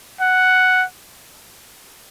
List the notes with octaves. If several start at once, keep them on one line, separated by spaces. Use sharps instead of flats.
F#5